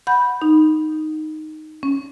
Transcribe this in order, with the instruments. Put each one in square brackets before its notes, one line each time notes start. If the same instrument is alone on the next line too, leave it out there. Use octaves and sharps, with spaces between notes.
[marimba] F#5 B5 G6
D#4
C#4